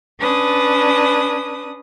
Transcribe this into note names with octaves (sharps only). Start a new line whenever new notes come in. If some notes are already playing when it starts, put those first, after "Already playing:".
C#4 D4 B4 D#6